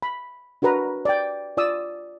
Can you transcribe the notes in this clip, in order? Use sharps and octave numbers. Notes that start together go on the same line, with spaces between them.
B5
D4 F#4 A#4 B4 A#5
D5 G5
F4 D5 D#6 E6